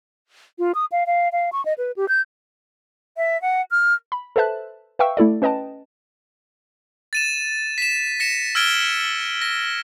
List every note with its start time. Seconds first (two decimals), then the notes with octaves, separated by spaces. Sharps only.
0.59 F4
0.75 D#6
0.92 F5
1.07 F5
1.32 F5
1.53 C#6
1.65 D#5
1.78 B4
1.96 G4
2.09 G6
3.17 E5
3.42 F#5
3.71 F6
4.12 B5
4.36 A4 B4 C5 E5 A5 F#6
4.99 B4 E5 F5 G5 C#6 E6
5.17 A3 E4 A4 D5
5.42 C#4 B4 D#5 G5 A5
7.13 A6 D#7 E7
7.78 B6 E7
8.20 A#6 C#7 E7
8.55 E6 F6 G#6 D7 G7
9.42 A#6